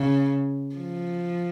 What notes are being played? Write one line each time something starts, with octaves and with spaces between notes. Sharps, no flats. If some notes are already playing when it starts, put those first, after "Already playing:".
Already playing: C#3
F3